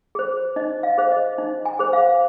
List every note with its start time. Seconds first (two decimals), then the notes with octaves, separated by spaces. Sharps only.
0.15 G#4 C5
0.56 D#4 D#5
0.83 F5
0.98 G#4 C5
1.12 D#5
1.38 D#4
1.66 G#5
1.79 G#4 C5
1.93 F5